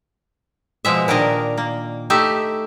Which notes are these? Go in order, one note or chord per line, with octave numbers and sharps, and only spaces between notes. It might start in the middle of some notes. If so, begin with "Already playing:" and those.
B2 F3 G#3 E5
A#2 D#3 D4 A#4 D#5
A#3
A3 D#4 G4 E5